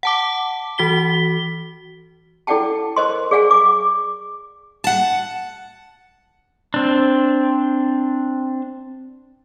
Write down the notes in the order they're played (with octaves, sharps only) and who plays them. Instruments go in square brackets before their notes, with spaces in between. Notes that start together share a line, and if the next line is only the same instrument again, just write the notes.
[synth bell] F#5 A5 D6
E3 F#4 B6 G7
[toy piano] E4 A4 D5 F#5 G5 A5
A#4 C5 D#5 C6
G#4 D5 F5 F#5 G#5
D6
[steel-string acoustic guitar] F#5 A5
[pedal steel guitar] C4 D4